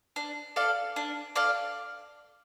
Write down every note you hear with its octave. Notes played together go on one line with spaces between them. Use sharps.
D4
A4 D5 F5
D4
A4 D5 F5